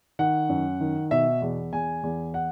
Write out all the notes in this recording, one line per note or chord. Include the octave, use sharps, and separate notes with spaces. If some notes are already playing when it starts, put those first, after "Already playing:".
D#3 F#5
F#2
D#3
B2 E5
E2
E2 G#5
E2
F#5